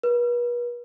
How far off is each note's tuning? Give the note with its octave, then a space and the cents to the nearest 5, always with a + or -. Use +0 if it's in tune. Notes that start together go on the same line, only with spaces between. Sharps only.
B4 -40